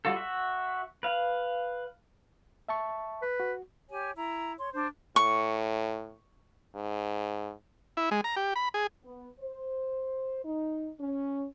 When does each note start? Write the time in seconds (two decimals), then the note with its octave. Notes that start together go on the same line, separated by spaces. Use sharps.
0.05 G3 F4 F#4 A4
0.16 F#4 E5
1.03 B4 F5
2.69 E5 A5 C#6
3.22 B4
3.40 F#4
3.90 G4 C#5 G#5
4.17 E4 A#5
4.59 C#5 C6
4.73 D4 C5
5.16 A2 C#6
6.75 G#2
7.97 E4
8.11 G#3
8.24 A#5
8.36 G4
8.56 B5
8.74 G#4
9.04 B3
9.40 C5
10.44 D#4
10.99 C#4